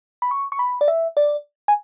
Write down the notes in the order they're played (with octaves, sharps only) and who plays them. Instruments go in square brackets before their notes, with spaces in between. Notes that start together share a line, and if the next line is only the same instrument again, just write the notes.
[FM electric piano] B5
C#6
C#6
B5
D5
E5
D5
G#5